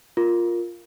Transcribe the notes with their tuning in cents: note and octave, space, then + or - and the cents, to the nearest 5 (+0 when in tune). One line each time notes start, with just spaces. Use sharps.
F4 +0 A#4 +0